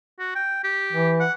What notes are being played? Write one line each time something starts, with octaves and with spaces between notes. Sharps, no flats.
F#4
G5
G4
E3
F#5